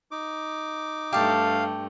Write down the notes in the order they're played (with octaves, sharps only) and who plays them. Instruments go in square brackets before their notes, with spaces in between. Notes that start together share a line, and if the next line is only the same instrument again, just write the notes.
[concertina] D#4 D6
[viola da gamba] G2 A3 [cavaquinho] G4 A5 [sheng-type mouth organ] F5